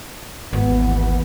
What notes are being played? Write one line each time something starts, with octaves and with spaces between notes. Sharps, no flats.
G#1 D#2 E3 B3